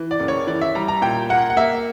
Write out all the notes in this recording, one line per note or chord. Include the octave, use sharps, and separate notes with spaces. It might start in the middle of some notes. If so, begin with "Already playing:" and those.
Already playing: E3
D5
F#1
C#5
E3 D5
E5
G3 A#5
A#5
A#2 G5
A#3 F#5
F#5
A#3 E5